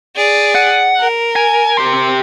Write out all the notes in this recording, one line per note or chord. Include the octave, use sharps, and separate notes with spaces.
G#4 D5
F#5
A#4
G#5
G4 C6